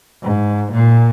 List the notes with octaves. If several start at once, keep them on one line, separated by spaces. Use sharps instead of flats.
G#2
A#2